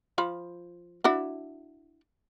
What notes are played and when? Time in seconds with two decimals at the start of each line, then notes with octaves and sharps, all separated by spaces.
0.18 F3 F4 B5
1.04 D4 E4 F#4